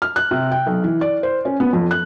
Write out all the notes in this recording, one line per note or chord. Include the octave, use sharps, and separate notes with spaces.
F6
F#6
C3
G5
B1
E3
D5
C5
C#4
B3
F2
F#6